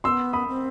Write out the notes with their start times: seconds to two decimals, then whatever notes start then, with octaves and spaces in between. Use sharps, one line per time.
0.04 B3 C4 C6 E6
0.33 B5 D#6
0.49 C4